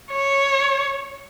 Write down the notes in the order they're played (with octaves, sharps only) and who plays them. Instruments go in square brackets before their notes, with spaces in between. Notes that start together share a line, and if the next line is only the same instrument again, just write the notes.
[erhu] C#5